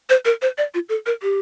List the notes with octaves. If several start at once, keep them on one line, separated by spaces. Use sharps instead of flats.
C5
A#4
C5
D5
F4
A4
A#4
G4